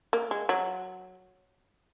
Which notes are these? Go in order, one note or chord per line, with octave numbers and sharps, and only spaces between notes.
A#3
G#3
F#3